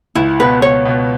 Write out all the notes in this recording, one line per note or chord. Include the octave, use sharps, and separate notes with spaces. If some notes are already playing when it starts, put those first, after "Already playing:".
C#2 E4
B2 B3 B4
C#2 C#5
B2 B3